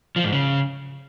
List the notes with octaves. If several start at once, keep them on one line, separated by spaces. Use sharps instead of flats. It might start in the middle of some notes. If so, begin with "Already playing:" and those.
F3
G#2
C#3